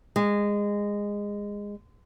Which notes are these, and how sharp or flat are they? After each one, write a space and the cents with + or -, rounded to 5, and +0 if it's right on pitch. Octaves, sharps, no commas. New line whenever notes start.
G#3 -20